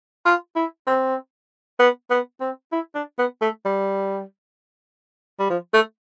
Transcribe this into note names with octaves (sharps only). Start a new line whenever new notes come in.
F4
E4
C4
B3
B3
C4
E4
D4
B3
A3
G3
G3
F3
A3